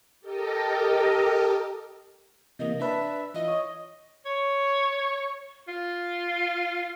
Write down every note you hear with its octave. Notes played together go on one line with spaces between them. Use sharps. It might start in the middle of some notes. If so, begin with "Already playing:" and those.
G4 A4 A#4 D#5
C3 E3 A#3 D#5
D4 B4 E5 A5
E3 F4 D#5
C#5 D#6
C#5
F4